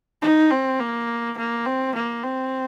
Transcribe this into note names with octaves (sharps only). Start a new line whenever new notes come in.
D#4
C4
A#3
A#3
C4
A#3
C4